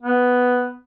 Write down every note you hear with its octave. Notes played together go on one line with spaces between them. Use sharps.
B3